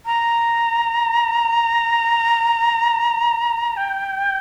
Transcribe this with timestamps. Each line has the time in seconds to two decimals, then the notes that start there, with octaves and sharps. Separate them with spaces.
0.06 A#5
3.77 G5